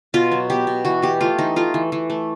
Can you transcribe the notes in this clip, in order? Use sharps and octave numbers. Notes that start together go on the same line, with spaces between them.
B2 F4
F#3
B3 G4
B2
E3 F#4
E3 G4
A3 F4
E3 D#4
A3 F4
E3
E3
A3